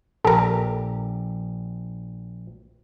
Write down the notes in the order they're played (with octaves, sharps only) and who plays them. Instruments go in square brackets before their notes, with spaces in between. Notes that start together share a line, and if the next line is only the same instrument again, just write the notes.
[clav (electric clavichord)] A#1 G4 [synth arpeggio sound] A4 A#4